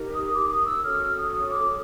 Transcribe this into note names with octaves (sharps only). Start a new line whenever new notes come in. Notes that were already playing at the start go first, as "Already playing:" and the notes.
Already playing: D#4 G4 A#4
D#6
D6
D#6
E6
C#4 F#4 A4 C#5 F6
D#6
D6